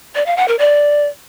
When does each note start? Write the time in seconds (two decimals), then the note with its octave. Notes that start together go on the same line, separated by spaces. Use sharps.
0.15 D5
0.26 F5
0.37 F#5
0.48 A#4
0.59 D5